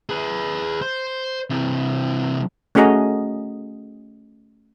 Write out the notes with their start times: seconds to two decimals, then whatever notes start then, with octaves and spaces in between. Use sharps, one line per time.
0.10 G#4 B4
0.81 C5
1.50 C3 E3
2.75 A3 C#4 F#4 G#4 D#5 A#5